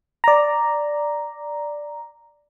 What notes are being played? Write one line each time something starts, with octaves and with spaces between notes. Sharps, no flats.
D5 A#5